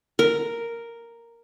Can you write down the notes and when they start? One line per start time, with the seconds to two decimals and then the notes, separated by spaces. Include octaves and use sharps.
0.19 A#4